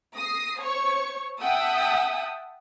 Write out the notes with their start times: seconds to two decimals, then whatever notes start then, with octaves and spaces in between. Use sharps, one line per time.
0.14 D#6 A#6 C7
0.58 C5 C#5 C#6
1.40 E5 F#5 G5 A5 D#6 E6